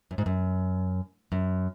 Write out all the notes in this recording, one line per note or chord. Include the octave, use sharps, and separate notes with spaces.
F#2
G#2
F#2
F#2